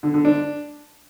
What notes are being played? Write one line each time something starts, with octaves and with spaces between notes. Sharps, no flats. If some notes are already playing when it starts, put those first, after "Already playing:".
D3
D3
D4